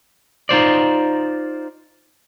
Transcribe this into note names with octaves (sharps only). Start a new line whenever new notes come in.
D#4 F4 C5 D5